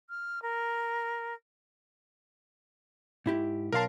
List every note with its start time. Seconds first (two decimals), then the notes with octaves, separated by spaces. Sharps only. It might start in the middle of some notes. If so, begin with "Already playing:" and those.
0.09 F6
0.42 A#4
3.26 G#2 E4 G4
3.72 B1 A#4 F5 A5 C6